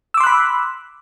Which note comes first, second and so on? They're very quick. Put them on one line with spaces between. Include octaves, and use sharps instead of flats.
E6 D6 C6 F#6 B5